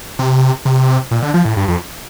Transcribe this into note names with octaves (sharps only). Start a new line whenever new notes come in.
C3
C3
A#2
D3
F3
A2
G2
F2